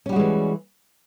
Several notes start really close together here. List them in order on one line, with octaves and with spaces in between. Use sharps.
C#4 G3 F#4 G#3 E3